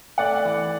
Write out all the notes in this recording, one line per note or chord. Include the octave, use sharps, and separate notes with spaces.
A3 D5 F#5
E3